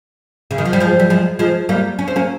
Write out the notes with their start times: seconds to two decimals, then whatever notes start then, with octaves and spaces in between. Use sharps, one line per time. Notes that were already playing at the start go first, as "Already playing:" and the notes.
0.51 C#3
0.58 D#3
0.65 F3
0.73 G3
0.80 F3 G#3
0.99 G3
1.10 F3 G#3
1.39 F3 G#3
1.69 G3 A#3
1.99 C#4
2.08 C4
2.16 A#3 C#4